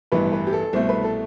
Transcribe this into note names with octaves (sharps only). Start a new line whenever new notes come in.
A1 G2 E3 G3 B3 B4
B4
G4
A4
C2 B2 A3 C5
B4
A4